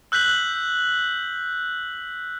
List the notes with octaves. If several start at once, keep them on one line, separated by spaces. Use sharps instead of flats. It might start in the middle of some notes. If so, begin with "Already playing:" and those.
E6 F#6 G6 B6 F#7